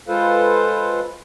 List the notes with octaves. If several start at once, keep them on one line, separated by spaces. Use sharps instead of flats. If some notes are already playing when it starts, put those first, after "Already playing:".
G#3 F4 A4 B4 C5 F5